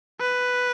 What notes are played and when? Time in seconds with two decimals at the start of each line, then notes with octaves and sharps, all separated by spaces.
0.20 B4